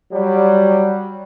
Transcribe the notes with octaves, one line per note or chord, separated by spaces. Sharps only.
F#3 G3